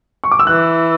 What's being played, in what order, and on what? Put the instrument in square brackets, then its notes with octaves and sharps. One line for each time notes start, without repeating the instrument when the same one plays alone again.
[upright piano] C#6
D6
E6
[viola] E3 [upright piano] F#6